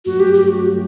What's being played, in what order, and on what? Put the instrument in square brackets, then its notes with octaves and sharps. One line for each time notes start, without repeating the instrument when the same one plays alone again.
[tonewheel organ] G2 F#3 A3 [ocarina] F#4
[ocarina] G4
G4
F#4